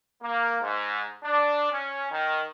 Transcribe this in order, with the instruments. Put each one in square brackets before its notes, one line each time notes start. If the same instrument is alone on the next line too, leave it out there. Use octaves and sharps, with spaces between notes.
[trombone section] A#3
G#2
D4
C#4
D#3